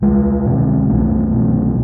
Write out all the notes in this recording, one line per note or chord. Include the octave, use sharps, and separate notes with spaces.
C2 G#3
B2
C2 A3
B2